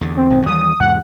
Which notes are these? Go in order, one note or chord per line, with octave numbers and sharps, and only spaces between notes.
E2 D3
C4
B1 G#2 D#3
D#2 E3 G3 D#6
E2 G#2 C3 F#5